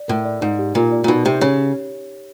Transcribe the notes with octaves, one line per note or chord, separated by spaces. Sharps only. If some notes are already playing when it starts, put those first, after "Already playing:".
Already playing: D5
A2 A#4
D5
G#2 D#4
G4
A#2 A#4
D5
A#2
B2 D#4
C3 G4
C#3 C#5